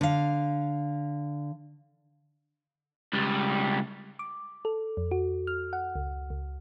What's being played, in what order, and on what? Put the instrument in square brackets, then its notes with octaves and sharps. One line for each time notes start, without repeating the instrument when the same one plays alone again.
[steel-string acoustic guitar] D3 F5
[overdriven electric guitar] C#2 G3
[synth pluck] D6
A4
F2
F#4
F6
F#5
C#2
C#2